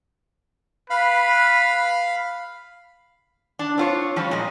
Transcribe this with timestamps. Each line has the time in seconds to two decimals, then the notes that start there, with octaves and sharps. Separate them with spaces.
0.90 B4 F5 B5
3.59 D4
3.78 C4 F4 C#5
4.16 F3 G3 C4 C#4
4.31 A#2 G#3 D#5